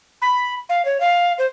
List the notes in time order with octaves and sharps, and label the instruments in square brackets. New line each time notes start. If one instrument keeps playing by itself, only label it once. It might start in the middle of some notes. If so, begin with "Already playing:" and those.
[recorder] B5
F5
C#5
F5
C5